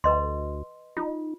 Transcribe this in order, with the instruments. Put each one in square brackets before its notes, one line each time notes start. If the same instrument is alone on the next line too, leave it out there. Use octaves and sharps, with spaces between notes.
[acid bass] D2 [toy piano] B4 D#5 C6
[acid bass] D#4 [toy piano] F4